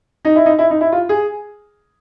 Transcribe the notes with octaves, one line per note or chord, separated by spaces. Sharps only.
D#4
E4
D#4
E4
D#4
E4
F4
G#4